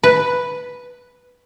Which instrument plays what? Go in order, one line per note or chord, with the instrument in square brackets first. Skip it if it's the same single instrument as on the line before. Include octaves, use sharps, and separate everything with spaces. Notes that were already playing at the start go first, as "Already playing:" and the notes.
[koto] B4